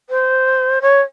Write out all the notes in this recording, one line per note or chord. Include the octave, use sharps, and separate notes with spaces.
C5
C#5